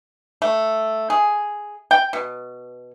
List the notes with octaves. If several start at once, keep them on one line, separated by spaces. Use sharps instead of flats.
A3
G#4
G5
B2